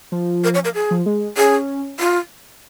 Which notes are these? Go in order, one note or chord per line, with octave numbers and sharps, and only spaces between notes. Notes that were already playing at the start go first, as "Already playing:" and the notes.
F3
A#4
C#5
A#4
G#4
F3
G#3
C#4 G#4
F4